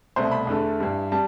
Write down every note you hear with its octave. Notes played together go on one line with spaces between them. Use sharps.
C2 B2 A3 C5
B5
E2 D3 A3
G2 E3 G3
G3 A5